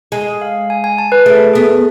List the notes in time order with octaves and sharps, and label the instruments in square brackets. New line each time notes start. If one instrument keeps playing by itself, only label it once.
[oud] G#3 [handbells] G#5
[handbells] F5
G#5
G#5
A5
B4
[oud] A3 [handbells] G#4
[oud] B3 [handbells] G#4